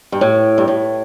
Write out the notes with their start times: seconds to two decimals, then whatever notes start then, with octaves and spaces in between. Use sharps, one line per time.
0.12 G2
0.21 A2
0.58 G2
0.68 A2